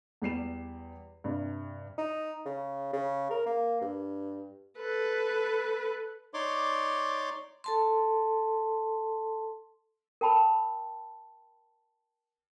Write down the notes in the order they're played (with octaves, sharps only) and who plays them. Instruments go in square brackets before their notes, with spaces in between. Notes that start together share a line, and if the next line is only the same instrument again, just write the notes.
[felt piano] E2 G3 C7 E7
G2 C3
[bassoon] D#4
C#3
C#3
A#4
A#3
G2
[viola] A4 B4
[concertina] D#4 C#5 D5 C6 D6
[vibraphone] A4 A5 C6
[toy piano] A#4 G5 A5 B5 E6